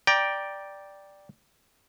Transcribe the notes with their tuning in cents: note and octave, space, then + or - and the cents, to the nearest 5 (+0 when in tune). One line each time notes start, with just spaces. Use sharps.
D5 +0 G5 +0 A#5 +25